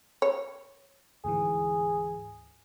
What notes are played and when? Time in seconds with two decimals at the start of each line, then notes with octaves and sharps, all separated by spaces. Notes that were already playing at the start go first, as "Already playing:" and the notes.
0.22 C#5
1.24 D2 G#2 E3 G#4